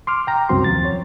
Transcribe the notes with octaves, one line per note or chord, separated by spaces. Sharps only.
C6 D6 F6
G5 A#5
C2 F#2 C4 C#4 F#4 C6
D#2 F3 A6
C#5